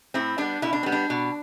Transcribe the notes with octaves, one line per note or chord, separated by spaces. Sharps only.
A2 C4 E4
G3 B3 D4
B2 E4
D4
C4
G3 B3
D4
B2